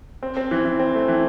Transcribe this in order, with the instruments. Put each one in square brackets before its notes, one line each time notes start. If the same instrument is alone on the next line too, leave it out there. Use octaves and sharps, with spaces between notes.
[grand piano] C4
C4
E3
E3
C4
A3
E3